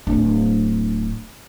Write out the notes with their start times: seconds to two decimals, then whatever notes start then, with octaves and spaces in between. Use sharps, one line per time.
0.07 D1 D4